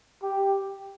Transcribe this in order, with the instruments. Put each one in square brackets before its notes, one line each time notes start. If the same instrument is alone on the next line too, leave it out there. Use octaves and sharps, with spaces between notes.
[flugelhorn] G4